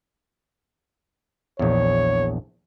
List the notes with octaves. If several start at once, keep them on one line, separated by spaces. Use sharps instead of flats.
A#1 E2 C#5